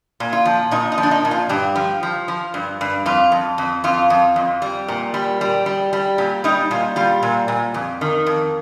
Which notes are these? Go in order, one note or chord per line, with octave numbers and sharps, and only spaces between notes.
A#2
F4
F3
A#2 D#4
D#4
F3
D4
D#4
A#2
F4
G2 G4
F3
F3
F3
G2
G2
F2 F4
F2
F2
F2 F4
F2
F2
G3
A#2
G3
G3
G3
G3
A#2 G4
G3 D#4
A#2 F4
G3 F4
A#2
A#2
F2
D#3
F2